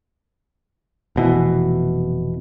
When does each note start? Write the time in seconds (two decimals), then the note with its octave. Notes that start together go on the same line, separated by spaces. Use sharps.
1.16 F1 B2 E3